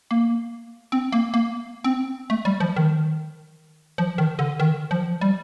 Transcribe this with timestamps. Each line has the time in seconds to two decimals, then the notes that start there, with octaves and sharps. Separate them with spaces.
0.11 A#3
0.92 C4
1.12 A#3
1.34 A#3
1.84 C4
2.30 A3
2.45 G3
2.60 F3
2.76 D#3
3.98 F3
4.18 D#3
4.39 D3
4.60 D#3
4.91 F3
5.21 G3